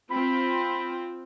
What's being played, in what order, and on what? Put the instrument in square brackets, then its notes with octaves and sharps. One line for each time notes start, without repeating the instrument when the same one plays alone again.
[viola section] C4 F4 [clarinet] B5